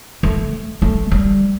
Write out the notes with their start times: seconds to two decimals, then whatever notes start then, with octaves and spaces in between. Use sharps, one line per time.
0.23 A3
0.82 A3
1.11 G3